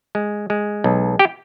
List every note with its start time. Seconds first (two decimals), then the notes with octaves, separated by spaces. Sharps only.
0.15 G#3
0.50 G#3
0.84 B1
1.19 G4 G5